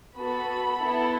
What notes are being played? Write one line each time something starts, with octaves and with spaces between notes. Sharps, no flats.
B3 F#4 A4 B5
B3 E4 A4